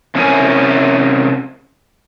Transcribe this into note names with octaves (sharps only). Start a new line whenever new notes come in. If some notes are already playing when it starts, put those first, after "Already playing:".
C3 C#4 D4 E4 A#4 G#5